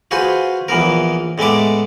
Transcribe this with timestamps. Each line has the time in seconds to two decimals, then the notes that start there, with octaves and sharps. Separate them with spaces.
0.11 F4 F#4 G#4 B4 C5
0.68 A#1 E3 B3 A#4
1.38 A2 G#3 B3 E5 D6